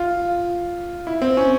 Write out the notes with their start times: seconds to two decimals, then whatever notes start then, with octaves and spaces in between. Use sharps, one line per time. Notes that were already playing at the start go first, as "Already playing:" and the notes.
Already playing: F4
1.07 E4
1.22 C4
1.37 C#4